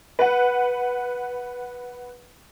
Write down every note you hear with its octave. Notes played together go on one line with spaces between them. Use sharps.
B4 F#5